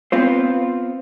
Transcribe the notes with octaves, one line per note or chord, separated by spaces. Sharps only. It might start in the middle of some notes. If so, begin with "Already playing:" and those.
B3 C4 F4 C5